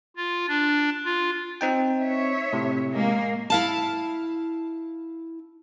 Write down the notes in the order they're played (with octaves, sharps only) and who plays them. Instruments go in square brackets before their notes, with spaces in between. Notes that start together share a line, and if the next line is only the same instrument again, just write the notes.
[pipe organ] F4
D4
F4
[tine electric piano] C4 D#4 G5
[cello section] C#5 E5
[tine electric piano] A2 C3
[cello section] G#3 A#3
[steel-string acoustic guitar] E4 F5 A5